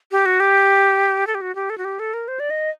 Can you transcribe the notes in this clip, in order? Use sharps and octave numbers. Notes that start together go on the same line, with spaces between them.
G4
F#4
G4
A4
G4
F#4
G4
A4
F#4
G4
A4
A#4
C5
D5
D#5